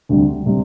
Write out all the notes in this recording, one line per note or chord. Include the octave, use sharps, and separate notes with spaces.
D2 C3 G3
C3 G3